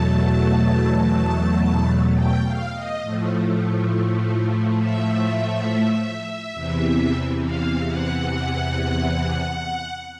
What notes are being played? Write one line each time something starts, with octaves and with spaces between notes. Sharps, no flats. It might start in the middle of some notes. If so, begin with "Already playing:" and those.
Already playing: E2 B2 F#3 A3 A5
G5
F5
D#5
A2 F3 A3
E5
E2 C3 E3
F5
F#5
F#5